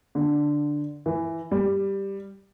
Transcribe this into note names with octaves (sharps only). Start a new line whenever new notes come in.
D3
E3
G3